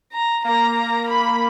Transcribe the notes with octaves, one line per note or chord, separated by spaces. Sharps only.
A#5
A#3 A#5
A#3
B5